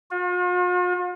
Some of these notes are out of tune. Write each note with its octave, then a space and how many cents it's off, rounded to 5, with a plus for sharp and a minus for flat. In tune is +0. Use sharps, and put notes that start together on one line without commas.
F4 +45